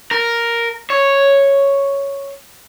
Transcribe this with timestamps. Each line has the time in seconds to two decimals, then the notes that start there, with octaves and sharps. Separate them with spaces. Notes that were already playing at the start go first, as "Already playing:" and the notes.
0.11 A#4
0.90 C#5